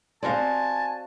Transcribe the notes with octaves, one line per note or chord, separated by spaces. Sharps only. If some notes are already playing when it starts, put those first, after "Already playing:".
C4 F#4 C5 D5 D#5 F5 G#5 A5